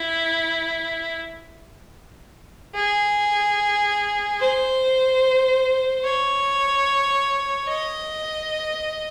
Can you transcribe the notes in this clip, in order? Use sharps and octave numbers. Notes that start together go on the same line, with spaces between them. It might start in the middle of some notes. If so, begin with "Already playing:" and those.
Already playing: E4
G#4
C5
C#5
D#5